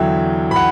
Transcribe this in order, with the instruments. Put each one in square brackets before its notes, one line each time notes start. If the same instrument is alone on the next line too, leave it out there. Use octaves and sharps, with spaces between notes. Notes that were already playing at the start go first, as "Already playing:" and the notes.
Already playing: [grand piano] E2 D3 F#3 E5 G5
B5
F#5